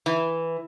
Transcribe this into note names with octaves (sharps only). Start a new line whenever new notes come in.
E3